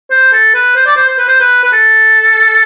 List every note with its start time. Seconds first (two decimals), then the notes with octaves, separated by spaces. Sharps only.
0.11 C5
0.33 A4
0.54 B4
0.76 C5
0.86 D5
0.96 C5
1.08 C5
1.18 B4
1.28 C5
1.40 B4
1.63 B4
1.72 A4